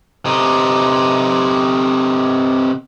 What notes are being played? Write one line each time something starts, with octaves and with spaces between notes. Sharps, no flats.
C3 D#4